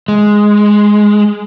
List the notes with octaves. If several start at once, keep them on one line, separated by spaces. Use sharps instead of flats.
G#3